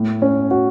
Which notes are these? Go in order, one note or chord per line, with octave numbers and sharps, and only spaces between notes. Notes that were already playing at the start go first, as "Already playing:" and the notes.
Already playing: A2
C#4
F#4